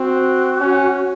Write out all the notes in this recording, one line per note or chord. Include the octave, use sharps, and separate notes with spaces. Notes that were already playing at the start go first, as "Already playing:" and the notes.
Already playing: C4 F#4
C#4
F#4